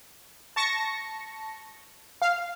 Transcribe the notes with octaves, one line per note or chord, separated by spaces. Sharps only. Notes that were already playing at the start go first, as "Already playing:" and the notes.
A5 C#6 A#6 C#7
F5